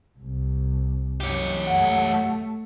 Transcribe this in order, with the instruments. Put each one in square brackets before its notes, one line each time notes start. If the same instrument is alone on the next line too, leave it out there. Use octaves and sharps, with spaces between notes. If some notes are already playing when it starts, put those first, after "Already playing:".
[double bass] C2
[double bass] F#2 [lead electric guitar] G4 C#5
[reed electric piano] F#2 F#5 [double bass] A3